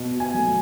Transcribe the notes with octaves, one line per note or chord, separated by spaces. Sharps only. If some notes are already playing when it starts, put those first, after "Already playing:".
Already playing: B2
G#5
F#3 A3